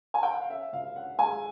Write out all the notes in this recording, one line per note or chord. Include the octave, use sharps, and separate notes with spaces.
G#5
G5
F#5
F5
C#4 E5
C#2 F5
C#4 F#5
G#3 G#5